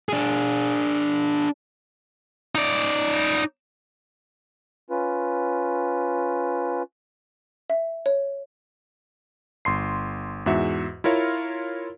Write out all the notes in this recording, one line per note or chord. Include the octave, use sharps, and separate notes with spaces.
D4 G#4
D#4 D5
C#4 F4 B4
E5
C#5
G1 C6 C7
E2 G#2 F#4 E5
E4 F4 A#4 C#5 F5